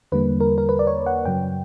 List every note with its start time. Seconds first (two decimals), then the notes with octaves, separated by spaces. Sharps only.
0.12 E2 D3 G3 A#3 B4
0.40 A#4
0.58 A#4
0.69 B4
0.79 D5
0.87 C#5
1.06 F#5
1.25 F#2 C#3 F#3 G5